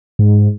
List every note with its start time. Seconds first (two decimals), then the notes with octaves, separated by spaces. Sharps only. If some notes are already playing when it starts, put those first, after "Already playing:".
0.19 G#2